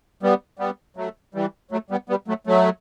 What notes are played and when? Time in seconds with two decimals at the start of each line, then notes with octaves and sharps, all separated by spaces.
0.23 G3 B3
0.59 G3 B3
0.97 F#3 A3
1.34 E3 G3
1.71 F#3 A3
1.90 G3 B3
2.09 G3 B3
2.28 F#3 A3
2.47 F#3 A3